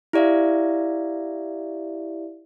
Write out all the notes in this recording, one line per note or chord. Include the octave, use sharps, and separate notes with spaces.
E4 G4 D5 E5 F5